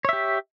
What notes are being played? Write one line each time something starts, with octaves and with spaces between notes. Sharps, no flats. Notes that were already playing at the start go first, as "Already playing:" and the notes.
G4 C#5 E5